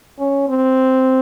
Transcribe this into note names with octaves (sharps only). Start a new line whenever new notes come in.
C#4
C4